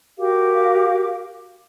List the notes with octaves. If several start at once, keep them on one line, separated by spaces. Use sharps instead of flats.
F#4 G4 A#4 F5